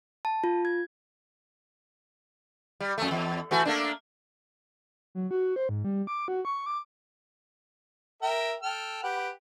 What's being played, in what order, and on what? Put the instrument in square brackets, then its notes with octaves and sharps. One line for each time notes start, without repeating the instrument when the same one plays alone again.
[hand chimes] A5
F4
G#6
[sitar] G3
F2 A3
E2
E3 A3 F#4
A3 A#3 D4
[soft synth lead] F#3
F#4
C5
G#2
G3
D6
F#4
C#6
D6
[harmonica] A#4 E5 G5
A4 G5 F6
G4 B4 F#5